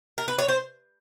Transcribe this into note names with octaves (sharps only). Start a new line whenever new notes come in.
A#4
B4
C#5
C5